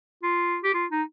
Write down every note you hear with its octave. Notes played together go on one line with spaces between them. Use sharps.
F4
G4
F4
D#4